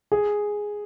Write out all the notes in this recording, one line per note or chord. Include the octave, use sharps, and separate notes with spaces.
G#4